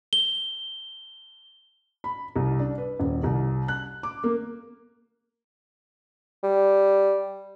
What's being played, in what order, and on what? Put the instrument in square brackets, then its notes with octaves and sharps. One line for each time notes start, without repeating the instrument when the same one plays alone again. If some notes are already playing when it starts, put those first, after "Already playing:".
[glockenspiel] G7
[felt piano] B5
C2
D4
B4
D#1
C2
F#6
D6
A#3
[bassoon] G3